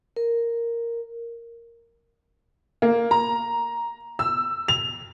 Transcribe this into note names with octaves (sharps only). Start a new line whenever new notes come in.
A#4
A#3
A#5
E6
F7